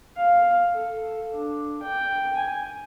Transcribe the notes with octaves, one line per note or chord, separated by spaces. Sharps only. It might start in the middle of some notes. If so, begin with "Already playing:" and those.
F5
A4
D4
G5
G#5